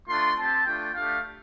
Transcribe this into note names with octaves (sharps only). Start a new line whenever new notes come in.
A3 D4 F4 C6
C4 G4 A5
A3 D4 F4 G5
A3 D4 G4 F5